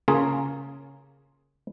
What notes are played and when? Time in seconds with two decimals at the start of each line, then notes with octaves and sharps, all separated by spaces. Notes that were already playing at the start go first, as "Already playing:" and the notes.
0.08 C#3 A#3 C#4 F4 G#4